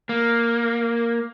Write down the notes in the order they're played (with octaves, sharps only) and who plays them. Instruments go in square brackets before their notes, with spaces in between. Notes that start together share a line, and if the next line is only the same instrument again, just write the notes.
[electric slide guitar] A#3